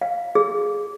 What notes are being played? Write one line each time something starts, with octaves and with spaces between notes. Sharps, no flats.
F5
G#4